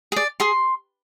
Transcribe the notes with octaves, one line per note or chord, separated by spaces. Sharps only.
G#4 D5
G#4 C6